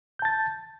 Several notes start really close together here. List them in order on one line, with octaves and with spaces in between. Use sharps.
G6 A5 A6